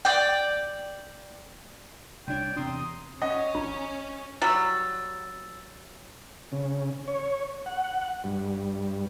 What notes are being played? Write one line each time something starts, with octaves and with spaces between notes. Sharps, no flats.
D5 G5
C2 D4 C#5 D5 G5
E2 C3 D4 A#5 C6 D#6
C#4 D#5 F#5
A1 D4 A#5
F#3 G3 E6 A6
C#3
C#5
F#5
G2